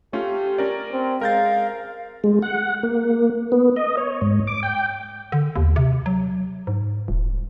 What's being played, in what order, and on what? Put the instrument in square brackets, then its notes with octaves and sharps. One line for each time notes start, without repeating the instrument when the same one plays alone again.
[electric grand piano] A3 C#4 F4 [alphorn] G4
[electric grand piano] C#4 A#4 D5
[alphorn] C4
[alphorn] G#3 [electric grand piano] A#4 G6 A6 [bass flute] F5
[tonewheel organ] G#3
F#5
A#3
B3
D#5
C#5
G#2
D6
G5
[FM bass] D3
D#2
C3
F#3
G#2
D#1